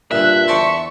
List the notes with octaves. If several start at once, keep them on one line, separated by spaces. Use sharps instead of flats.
G2 A#2 E5 F#6
E2 C5 D5 A5 C#6